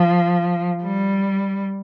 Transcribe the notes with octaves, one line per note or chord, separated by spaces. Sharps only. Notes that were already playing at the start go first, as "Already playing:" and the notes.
Already playing: F3
G3